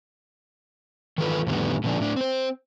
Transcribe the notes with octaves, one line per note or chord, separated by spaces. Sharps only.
D#3 E3 F#3 F4 A4 B4
F2 A2 D3 D#3 G3 B3
A#2 D3 F3 B3 D4
A2 D4
C4 C5